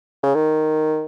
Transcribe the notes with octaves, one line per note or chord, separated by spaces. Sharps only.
C#3
D#3